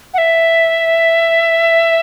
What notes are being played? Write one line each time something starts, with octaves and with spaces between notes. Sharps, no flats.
F#5
E5